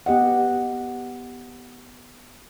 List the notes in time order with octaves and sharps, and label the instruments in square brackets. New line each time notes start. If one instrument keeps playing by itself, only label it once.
[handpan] B3 G4 D#5 F#5